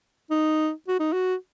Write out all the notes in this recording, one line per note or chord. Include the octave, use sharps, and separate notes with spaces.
D#4
F#4
D#4
F#4